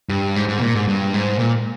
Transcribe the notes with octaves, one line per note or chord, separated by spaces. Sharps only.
G2
G#2
G#2
C3
A#2
G#2
G2
G#2
A#2